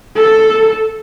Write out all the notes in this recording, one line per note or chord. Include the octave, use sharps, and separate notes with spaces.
A4